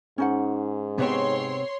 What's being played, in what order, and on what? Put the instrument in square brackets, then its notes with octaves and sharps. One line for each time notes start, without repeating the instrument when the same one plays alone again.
[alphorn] G#2 [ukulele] C#4 D#4 F#5
[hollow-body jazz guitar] C3 B3 C4 [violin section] C#5 C6